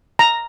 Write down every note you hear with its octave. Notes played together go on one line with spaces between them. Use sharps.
A#5